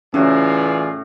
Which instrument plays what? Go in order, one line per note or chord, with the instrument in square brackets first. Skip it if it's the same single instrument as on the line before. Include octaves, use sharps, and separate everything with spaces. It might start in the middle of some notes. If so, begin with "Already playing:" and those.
[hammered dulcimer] A2 F#4 A#5 [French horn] E3 [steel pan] C#4 [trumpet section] F4 G#4 D5